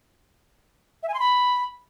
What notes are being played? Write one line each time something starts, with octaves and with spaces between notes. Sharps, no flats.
E5
G#5
C6
B5